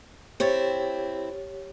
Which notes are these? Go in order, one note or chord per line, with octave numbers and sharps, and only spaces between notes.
C4 E4 G4 C#5 A6